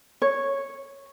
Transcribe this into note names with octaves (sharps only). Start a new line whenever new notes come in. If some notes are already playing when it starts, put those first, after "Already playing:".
C#5